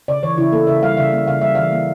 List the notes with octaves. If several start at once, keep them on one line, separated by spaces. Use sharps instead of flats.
C#3 D5
E3 C#5
C#3 E4
A#3 A4
C#3 E5
G3 F5
C#3 E5
A#3
C#3 F5
G3 E5
E3 F5
A#3